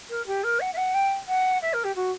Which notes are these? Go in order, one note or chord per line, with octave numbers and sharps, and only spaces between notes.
A#4
G4
A#4
F#5
E5
F#5
G5
F#5
E5
A#4
G4
F#4